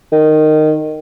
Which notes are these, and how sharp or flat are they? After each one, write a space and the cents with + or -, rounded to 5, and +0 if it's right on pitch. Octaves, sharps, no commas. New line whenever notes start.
D#3 -15